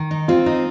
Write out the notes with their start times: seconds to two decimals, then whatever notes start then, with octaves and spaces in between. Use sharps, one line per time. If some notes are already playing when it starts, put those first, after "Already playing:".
Already playing: D#3
0.11 D#4
0.28 C4 F4
0.46 D#4